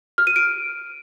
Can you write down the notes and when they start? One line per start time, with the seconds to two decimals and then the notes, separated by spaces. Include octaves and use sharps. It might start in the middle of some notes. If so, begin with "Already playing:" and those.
0.18 F6
0.27 D#7
0.36 D7